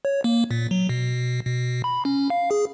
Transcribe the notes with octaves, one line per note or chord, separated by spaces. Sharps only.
C#5
A#3
A#2
F#3
B2
B2
B5
C#4
F5
G#4